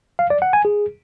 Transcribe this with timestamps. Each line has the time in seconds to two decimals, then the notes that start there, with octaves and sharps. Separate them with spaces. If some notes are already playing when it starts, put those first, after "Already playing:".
0.19 F5
0.30 D5
0.42 F#5
0.53 G#5
0.65 G#4